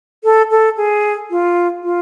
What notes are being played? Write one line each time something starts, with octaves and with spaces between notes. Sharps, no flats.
A4
A4
G#4
F4
F4